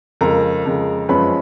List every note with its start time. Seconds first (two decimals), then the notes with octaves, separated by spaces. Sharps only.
0.21 F2 C#3 G#3 A#4 A#5
0.65 F2 C#3 G#3
1.09 F#2 F3 G#3 C#4 B4 B5